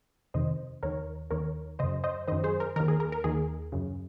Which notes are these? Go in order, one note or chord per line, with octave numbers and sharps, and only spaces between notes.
F2 C3 D#3 C5 D#5
D#2 D#3 A#4 C#5
D#2 D#3 A#4 C#5
F#2 C#3 C5 D#5
C5 D#5
F#2 D#3 C5 D#5
G#4 C5
A#4
D#2 D#3 A#4
G#4
A#4
A#4
D#2 D#3 G#4
F#2 C#3